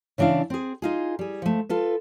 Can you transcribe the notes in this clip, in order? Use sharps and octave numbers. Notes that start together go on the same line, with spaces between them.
C#3 E3 D4 E4 F5
C4 G#4
D#4 F4 G#4
G3 G#4
F3 A3
F4 A4 B4